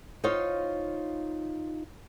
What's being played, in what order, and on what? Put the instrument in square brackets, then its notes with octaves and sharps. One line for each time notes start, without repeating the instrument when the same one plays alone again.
[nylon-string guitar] D#4 F4 C5 C#5 F5